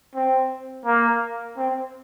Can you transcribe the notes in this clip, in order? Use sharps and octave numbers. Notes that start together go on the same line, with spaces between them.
C4
A#3
C4